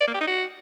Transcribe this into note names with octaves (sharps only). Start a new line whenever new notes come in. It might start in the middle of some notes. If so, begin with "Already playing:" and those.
D5
A#3
G4
D#4
F#4